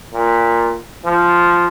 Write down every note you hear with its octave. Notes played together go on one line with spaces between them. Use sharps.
A#2
F3